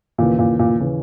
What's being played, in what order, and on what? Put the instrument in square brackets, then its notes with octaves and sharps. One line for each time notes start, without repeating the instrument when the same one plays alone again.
[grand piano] D#2 C#3 E3 [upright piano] A#2
[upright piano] A#2
A#2
[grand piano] C#3 E3